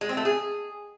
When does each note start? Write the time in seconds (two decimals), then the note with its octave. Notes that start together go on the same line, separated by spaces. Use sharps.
0.01 G#3
0.09 C4
0.17 A3
0.25 G#4